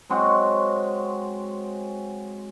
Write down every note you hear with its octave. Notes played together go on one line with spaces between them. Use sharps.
F#3 G#3 C4 F#4